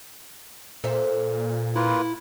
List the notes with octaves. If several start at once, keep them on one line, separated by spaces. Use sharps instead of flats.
A#2 A4 C5 E5
A#3 E4 F4 B4